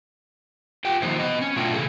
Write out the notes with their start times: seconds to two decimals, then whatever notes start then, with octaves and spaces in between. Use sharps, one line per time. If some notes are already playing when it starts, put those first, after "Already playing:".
0.85 F4 G4 G5
1.02 D#3 F3 A#3 D#4 F4 C5
1.19 B3 D#5
1.41 C#4
1.56 B2 A3 D4 F4 E5 G5
1.74 C#3 G#4 A4